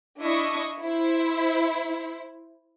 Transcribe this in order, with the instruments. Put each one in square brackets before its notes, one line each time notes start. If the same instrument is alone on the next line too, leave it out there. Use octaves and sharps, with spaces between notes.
[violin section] D4 E4 D#5 E5 C#6 D#6
E4 C5